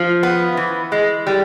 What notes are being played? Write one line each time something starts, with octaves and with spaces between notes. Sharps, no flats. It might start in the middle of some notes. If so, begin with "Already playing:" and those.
Already playing: F3
B3
E3
G#3
G3